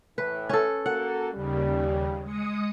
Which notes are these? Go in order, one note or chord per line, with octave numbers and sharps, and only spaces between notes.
A2 E3 B4
C#4 A4
A#3 F#4 A4 F#5
D#2 C#3 G3
G#3 D#6 C#7